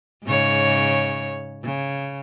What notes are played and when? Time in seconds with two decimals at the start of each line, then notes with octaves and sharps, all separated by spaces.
0.24 G#2 C#3 C#5
1.64 C#3